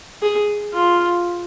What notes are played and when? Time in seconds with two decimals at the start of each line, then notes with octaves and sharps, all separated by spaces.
0.22 G#4
0.73 F4